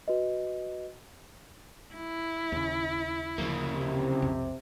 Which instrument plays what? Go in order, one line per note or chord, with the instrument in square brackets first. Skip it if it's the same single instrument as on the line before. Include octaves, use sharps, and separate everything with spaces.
[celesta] F#4 B4 D#5
[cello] E4
[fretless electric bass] D#2 C#3
[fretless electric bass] D2 F3 [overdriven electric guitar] C#3 A#3
[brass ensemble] C3
[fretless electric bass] B1 F2